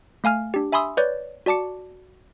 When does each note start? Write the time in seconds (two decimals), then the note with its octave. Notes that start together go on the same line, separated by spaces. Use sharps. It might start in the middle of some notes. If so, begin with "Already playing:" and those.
0.24 A3 F5 G#5 F6
0.54 D4 G4
0.72 E5 G#5 B5 C6 D#6 E6
0.97 B4 C#5 D5 G6 A6
1.46 F#4 D5 A5 D6 C#7